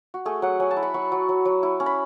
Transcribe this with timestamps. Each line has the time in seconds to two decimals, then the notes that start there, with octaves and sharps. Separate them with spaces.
0.14 F#4
0.25 A3 G#4
0.42 F#3 F#5
0.60 F#3 G#5
0.71 A5
0.76 E4
0.83 B5
0.94 F#3 C#6
1.12 F#3
1.29 F#3
1.45 F#3
1.63 E4
1.80 C#4
1.86 B5